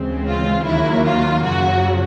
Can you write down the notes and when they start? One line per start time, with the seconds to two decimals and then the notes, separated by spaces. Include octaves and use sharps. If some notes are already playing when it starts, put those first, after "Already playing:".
Already playing: D2 C#3 E3 G#3 C4
0.27 F4
0.65 D#2 D#3 F#3 A#3 E4
1.04 F4
1.43 F#2 C#3 F#3 F#4